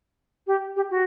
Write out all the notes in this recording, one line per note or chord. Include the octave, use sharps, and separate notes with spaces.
G4
G4
F#4